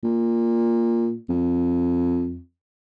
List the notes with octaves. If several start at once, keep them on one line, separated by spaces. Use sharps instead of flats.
A#2
F2